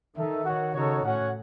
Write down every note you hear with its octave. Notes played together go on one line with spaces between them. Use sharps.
D#3 D#4 A4 E5
F#4 C#5 F#5
C#3 D#4 F#4 A4 C#5
A2 C#4 F#4 C#5 F#5